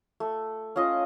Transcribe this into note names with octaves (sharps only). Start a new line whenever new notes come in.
A3
C#4 F4 D#5